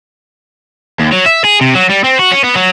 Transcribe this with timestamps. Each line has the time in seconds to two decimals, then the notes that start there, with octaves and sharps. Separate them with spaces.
0.99 D#2
1.12 F#3
1.26 E5
1.44 G#4
1.61 C3
1.75 F#3
1.90 G3
2.04 C4
2.19 F#4
2.32 C#4
2.44 B3
2.56 F#3